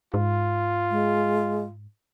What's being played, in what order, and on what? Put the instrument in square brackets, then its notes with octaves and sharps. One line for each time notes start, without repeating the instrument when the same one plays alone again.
[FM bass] G#2 [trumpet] F4
[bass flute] G#3